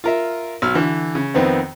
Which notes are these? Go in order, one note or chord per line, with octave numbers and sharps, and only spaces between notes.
F4 A#4 E5
B1 E6 F6
D3 E3
C#3
F2 D#3 B3 C4